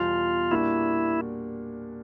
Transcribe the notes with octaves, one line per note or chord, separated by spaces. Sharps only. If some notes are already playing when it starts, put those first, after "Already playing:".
Already playing: E2 B2 G3 F4
A#2 G3 A#3 D4 E4 F#4